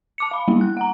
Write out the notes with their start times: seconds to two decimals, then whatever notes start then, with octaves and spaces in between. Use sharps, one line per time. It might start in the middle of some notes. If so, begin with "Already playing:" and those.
0.18 A5 D6 C#7
0.31 F5 B5
0.48 G3 A#3 B3 E4
0.61 F#6
0.77 F#5 A#5